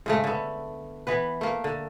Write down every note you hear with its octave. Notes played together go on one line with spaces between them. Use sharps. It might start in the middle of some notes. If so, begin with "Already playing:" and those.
G#2 C#3 A3
D3 B3
E3 B3 B4
A3 A#3
D3